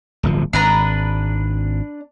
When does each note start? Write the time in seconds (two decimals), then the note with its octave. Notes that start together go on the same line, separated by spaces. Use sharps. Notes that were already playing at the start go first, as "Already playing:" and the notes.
0.23 D1 G1 F3
0.53 G#1 D4 B4 A#5